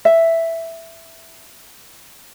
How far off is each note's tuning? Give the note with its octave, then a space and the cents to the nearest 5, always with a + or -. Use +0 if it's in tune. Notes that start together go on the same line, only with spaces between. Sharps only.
E5 +0